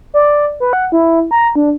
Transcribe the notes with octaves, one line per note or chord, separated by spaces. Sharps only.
D5
B4
F#5
E4
A#5
D4